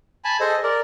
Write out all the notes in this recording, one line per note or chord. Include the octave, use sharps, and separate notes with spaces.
G#5 A5 B5
G#4 A4 C5 D#5
A#4 D5